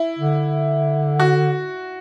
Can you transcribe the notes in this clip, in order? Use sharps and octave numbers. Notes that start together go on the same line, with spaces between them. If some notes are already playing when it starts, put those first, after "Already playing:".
Already playing: E4
D3
F#4